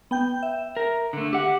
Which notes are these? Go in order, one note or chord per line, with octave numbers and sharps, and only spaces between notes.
B3 G5 G6
E5
A#4
D3 A3
G4 F#5